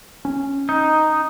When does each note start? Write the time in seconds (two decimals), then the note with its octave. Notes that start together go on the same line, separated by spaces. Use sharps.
0.25 C#4
0.69 D#4